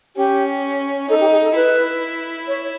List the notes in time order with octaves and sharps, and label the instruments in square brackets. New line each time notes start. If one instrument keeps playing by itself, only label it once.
[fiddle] C#4 [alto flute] G4
[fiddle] D#4 [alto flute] A4
[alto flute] G4
G#4
A4
[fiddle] E4 [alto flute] B4
[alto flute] C#5